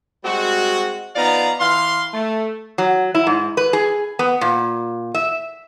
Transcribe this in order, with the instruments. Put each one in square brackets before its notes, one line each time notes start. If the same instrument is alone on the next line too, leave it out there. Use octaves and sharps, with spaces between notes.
[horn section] G3 G#3 C4 F#4
F3 B3 D#4 D5 F5 A#5
E3 F5 C6
A3
[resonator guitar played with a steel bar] F#3
E4
G#2
B4
G#4
B3
A#2
E5